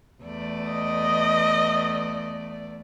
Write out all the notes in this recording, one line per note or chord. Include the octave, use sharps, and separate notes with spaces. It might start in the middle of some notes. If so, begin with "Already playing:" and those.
E2 A3 D5
D#5